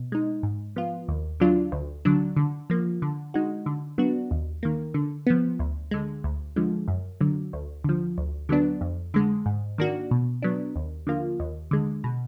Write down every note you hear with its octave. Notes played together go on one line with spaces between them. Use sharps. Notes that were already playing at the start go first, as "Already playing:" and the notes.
Already playing: B2
G#3 D#4
G#2
F3 B3 F4
D#2
D3 F#3 D4 F4
D2
D3 F#3 D4
D3
F3 A#3
D3
G#3 D#4 F#4
D3
F#3 B3 D4 F#4
D#2
D#3 A#3
D3
F3 B3
D2
D3 G#3
D2
D3 F3 G#3
F#2
D3 F#3
D2
D3 F3
D2
D3 F#3 B3 D4
F2
D3 G#3
G#2
D#3 A#3 D4 F#4
B2
F#3 B3 D4
D#2
D3 F3 A#3 F4
D#2
D3 G#3
B2